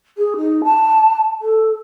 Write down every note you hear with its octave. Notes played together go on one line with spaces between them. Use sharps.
G#4
D#4
A5
A4